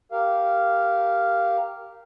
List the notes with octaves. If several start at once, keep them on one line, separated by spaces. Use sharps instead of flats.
G4 A#4 F5